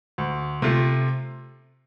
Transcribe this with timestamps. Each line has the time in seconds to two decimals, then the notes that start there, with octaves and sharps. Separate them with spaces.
0.18 D2
0.62 C3 A3 F4